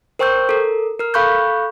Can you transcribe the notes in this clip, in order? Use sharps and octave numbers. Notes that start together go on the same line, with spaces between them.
A#4 C5 G5 C#6 E6 G6
A4 A#4
A#4 F6
A4 F5 B5 C#6 F#6 G6